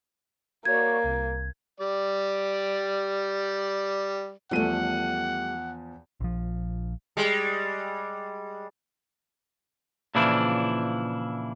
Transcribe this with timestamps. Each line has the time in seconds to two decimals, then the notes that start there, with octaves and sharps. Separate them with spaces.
0.65 A#3 F#4 C#5 D5 G#6
1.04 C2
1.80 G3 D5
4.51 E2 F3 G3 A3 F#5 D#7
6.20 A#1 F3
7.17 G3 G#3
10.15 A#2 C#3 E3 F3 D4 E4